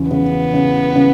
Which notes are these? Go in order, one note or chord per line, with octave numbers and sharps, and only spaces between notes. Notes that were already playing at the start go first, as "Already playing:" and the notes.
Already playing: E2 C#3
C#3 B3
C#3
C#3